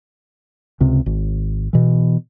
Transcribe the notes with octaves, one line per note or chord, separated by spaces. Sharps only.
C#2 C3
G#1
B2 E3